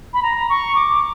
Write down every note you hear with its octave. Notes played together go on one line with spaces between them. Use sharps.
B5
A#5
C#6
D6